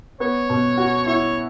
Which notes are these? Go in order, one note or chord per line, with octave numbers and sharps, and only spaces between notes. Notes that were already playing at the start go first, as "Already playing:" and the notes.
B3 C#5
B2
F#4
E4 C#5